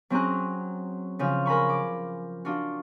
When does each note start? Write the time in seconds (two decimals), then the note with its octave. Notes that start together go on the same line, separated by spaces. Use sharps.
0.10 F#3 C4 C#4 G#4 A#5 F#6
1.19 C#3 F3 F6
1.46 A#4 G#5 B5 C#6
1.69 D6
2.45 D4 F4 F#4